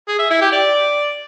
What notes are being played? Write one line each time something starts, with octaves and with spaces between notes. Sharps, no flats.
G#4
E5
E4
G4
D5